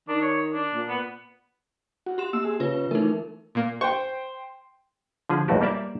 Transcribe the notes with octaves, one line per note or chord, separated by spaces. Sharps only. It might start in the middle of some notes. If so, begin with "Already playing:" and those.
D#3 D4
C#5
D4
A#2
B3
F#4
G4 C6 E7
A#3 E6
G#4
C#3 F4 B4
E3 A3 D#4 A#4
A#2 A#3
C5 G5 C#6
D3 F3 G#4
B1 F2 A3 F#4 G4
G3 A#3 G4 D5 E5